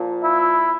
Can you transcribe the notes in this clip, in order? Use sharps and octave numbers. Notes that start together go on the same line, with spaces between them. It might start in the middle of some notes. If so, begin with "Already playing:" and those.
Already playing: A#2 F3
E4